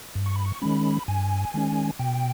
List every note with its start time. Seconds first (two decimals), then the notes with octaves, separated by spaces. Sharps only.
0.15 G2
0.26 C#6
0.36 B5
0.45 C#6
0.62 D#3 G#3 C#4 B5
1.08 G2 G#5
1.54 D#3 G#3 C#4
1.99 B2 G5